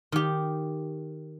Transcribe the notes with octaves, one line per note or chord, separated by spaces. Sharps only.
D#3 G4